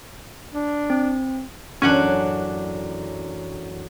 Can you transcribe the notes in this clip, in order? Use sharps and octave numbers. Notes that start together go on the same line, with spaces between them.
D4
C4
A1 F#2 C#4 D4 F#5 G#5